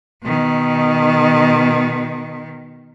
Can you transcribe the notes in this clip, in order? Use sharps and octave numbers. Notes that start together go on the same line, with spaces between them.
B2 D#3